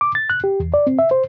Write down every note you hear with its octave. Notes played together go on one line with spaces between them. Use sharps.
D6
A6
F#6
G4
E2
D5
C4
E5
C5